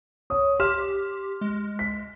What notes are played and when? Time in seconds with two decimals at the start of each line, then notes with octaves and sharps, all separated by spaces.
0.30 C#5 D#6
0.60 G4 C6 F6 E7
1.41 G#3
1.79 B6